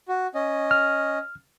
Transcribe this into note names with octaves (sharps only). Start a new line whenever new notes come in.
F#4
C#4 D#5
F6